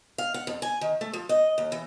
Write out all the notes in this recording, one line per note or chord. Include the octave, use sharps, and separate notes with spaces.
F5
F#5
F2
G#5
D#3
A3
F3
D#5
D#2
E3